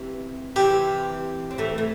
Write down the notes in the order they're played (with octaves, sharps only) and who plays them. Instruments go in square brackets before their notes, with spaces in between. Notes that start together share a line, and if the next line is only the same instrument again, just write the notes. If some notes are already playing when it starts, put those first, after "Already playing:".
Already playing: [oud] C3 E3
[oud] C3 E3 [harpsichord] G4
[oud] C4
E3 A3
A3